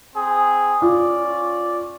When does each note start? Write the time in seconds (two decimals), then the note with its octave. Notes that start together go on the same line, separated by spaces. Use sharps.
0.16 C4 G#4
0.82 C#4 F4 D5